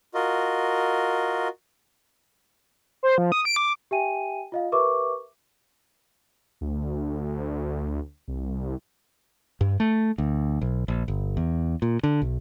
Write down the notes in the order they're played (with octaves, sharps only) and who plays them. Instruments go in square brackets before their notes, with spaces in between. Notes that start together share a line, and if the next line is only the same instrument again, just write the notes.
[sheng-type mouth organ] F4 F#4 A#4 D#5
[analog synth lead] C5
F3
D#6
D7
D6
[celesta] G4 E5 G5 G#5 D#7
F4 D#5 F5
G4 A#4 B4 E5 C#6 D6
[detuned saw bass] D2
C2
[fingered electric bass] G2
A3
D2
B1
A#1
G1
E2
A#2
D3
B1